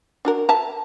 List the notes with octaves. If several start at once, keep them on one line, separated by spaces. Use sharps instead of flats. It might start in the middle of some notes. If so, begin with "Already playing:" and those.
D4 F#4 A#4
E5 A5 A#5